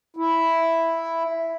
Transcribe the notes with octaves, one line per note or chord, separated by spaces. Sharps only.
E4